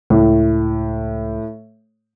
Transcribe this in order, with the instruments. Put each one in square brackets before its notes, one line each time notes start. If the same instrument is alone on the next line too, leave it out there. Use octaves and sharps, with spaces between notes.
[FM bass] C#2 [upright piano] A2